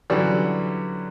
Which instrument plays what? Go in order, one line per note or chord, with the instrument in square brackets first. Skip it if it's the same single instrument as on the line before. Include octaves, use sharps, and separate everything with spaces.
[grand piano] D3 F#3 C#4 F#4 [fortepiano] E3 G3